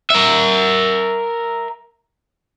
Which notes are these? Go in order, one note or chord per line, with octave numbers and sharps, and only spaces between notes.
A#4 E5